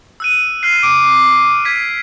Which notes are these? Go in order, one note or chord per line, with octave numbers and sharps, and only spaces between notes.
E6 F#6 D#7
F6 F#6 C7
D6 D7
G#6 B6